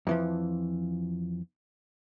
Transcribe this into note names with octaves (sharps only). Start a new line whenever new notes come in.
F2 E3 F3